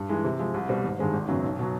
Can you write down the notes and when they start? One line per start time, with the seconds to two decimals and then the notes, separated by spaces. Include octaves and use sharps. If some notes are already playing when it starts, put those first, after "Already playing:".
Already playing: G2
0.09 E3 G#3
0.24 C3
0.39 F3 G#3
0.54 C2
0.69 B2 G3 C4
0.84 G#1
0.99 G2 D#3 G#3 C4
1.13 G#1
1.28 F#2 C#3 F#3 B3
1.44 B1
1.59 B2 F#3